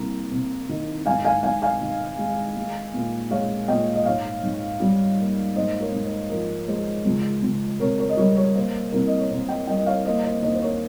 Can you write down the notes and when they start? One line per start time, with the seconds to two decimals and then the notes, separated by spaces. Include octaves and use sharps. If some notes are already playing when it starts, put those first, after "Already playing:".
Already playing: C2 A#3 A#5
0.31 C3
0.69 D#3
1.06 G#2 F5 G#5
1.25 F5 G#5
1.43 G#2 F5 G#5
1.62 F5 G#5
1.81 D#3
2.18 G#3
2.56 G#3
2.94 A#2
3.31 G#3 C#5 F5
3.68 A#2 D#5 G5
3.95 D#5
4.05 G#2 C#5 F5
4.43 G#2
4.80 G3
5.18 A#3
5.56 G#2 C5 D#5
5.81 A#4 C#5
5.92 G#2
6.05 C5
6.30 F3 A#4
6.68 G#3 C5
7.05 C#2
7.42 C#2
7.80 C3 A#4 C#5
7.98 A#4 C#5
8.09 D#5
8.17 G3 A#4 C#5
8.36 A#4 C#5
8.55 A#3 C5
8.92 C2 A#4
9.07 D#5
9.19 C#5
9.30 C3 C5
9.48 D#5 G5
9.67 G3 D#5 G5
9.78 D#5
9.86 C#5 F5
10.05 A#3 C5 D#5
10.24 C5 D#5
10.42 D#2 C5 D#5
10.54 C5
10.62 A#4 C#5